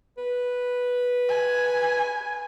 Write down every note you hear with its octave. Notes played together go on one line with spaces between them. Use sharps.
B4
G#5